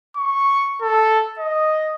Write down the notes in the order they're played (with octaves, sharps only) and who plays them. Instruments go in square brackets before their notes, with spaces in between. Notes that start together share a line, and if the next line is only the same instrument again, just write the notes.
[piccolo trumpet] C#6
A4
D#5